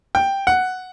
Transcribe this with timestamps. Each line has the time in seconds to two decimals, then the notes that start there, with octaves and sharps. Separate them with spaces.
0.15 G5
0.47 F#5